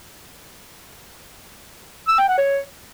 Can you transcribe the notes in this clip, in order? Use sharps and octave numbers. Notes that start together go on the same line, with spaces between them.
E6
G5
F#5
C#5